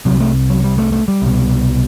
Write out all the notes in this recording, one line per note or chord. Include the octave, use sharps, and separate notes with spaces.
C2 C3 F#3
A3
F#3
G3
A3
A3
G3
C2 B2